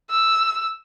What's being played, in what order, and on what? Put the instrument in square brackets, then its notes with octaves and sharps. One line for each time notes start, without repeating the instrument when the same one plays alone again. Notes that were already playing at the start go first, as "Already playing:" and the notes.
[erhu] E6